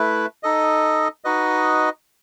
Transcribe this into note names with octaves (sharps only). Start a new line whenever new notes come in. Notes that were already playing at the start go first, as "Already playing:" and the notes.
Already playing: A3 E4 B4
D#4 A4 D#5
D#4 F#4 B4 D#5